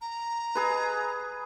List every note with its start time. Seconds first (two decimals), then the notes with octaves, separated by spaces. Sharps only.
0.01 A#5
0.55 G#4 B4